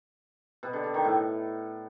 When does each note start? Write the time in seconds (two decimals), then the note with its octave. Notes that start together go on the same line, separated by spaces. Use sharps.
0.63 B2
0.73 D3
0.84 D3
0.94 D#3
1.05 A2